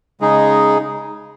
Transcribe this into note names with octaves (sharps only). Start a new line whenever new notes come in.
C#3 G#3 D#4 G#4